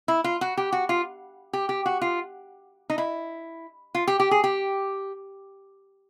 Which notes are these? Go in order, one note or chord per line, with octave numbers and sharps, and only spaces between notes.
E4
F4
F#4
G4
F#4
F4
G4
G4
F#4
F4
D#4
E4
F4
G4
G4
G#4
G4